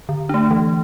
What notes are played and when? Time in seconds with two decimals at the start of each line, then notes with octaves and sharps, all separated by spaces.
0.09 D3
0.29 A3 D4
0.51 E3